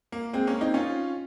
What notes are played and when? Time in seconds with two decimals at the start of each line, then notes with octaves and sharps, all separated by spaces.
0.12 A#3
0.33 G#3 C4
0.47 A#3 C#4
0.61 C4 D#4
0.74 C#4 F4